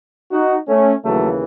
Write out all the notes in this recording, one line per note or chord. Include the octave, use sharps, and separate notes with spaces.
D#4 F#4
A3 C#4
D#2 C#3 E3 F#3 A3